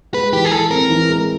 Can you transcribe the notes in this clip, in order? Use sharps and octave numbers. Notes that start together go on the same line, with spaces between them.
G#3 B4
E3 G4
G#4
E3 A4
C4 A#4
E3
G#3